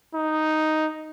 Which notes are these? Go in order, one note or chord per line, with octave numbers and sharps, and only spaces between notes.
D#4